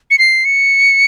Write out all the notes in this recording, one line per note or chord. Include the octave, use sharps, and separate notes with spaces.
C#7
C7
C#7